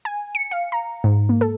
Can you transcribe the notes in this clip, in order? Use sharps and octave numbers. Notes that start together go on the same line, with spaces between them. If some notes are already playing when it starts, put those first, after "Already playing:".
G#5
C#7
F5
A#5
G#2
A#3
A4